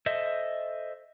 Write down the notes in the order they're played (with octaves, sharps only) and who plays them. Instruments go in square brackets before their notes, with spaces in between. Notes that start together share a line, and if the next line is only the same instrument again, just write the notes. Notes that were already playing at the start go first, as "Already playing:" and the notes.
[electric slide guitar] A4 C5 D#5 E5